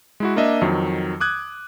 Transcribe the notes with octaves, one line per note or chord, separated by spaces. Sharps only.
G#3 E4 F#4
A#3 D4 D#5 E5
F2 D#3 F#3
D6 D#6 F#6 G#6